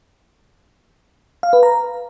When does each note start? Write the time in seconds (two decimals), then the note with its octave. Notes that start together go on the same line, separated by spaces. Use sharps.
1.43 F5
1.53 B4
1.63 A#5